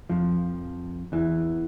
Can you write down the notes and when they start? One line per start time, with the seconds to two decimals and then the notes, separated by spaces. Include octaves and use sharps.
0.09 F2 F3
1.12 E2 E3